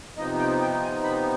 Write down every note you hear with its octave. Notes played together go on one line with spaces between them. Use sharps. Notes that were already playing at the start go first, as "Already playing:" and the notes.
C3 F3 B3 D#4 D#5
G5
G5
G#5
B5